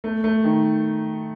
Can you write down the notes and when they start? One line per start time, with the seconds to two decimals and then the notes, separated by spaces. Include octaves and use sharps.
0.04 A3
0.24 A3
0.44 D#3